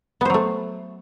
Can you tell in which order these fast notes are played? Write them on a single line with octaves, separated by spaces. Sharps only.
B3 C5 F#3 A3